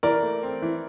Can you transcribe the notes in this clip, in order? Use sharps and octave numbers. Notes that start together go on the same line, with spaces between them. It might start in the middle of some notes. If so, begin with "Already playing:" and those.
E3 A#4 D5
A3
C4
E3